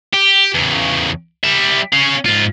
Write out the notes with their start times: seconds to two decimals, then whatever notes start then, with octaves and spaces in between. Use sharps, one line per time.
0.13 G4
0.54 E2 C#3
1.44 G3 E5
1.93 C#4 F5
2.26 G#2 F4